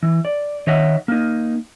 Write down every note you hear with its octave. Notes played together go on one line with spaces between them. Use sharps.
E3
D5
D#3 C#5 D#5 E5 F#5
A#3 D#4